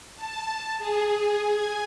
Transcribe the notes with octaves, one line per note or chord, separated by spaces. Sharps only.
A5
G#4
G#5